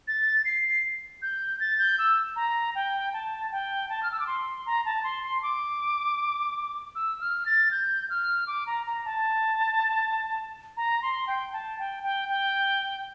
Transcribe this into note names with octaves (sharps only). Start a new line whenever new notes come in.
A6
C7
G6
A6
G6
E6
A#5
G5
A5
G5
A5
F6
E6
D6
C6
A#5
A5
C6
C6
D6
E6
F6
A6
G6
F6
D6
A#5
A#5
A5
A#5
C6
G5
A5
G5
G5
G5